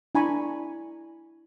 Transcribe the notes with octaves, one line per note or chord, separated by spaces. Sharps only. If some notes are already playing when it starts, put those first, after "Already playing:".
D4 E4 G#5 A#5 B5 C#6